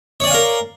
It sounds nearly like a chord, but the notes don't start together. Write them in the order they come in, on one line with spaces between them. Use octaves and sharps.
C#5 D5 G#5 F5 A#4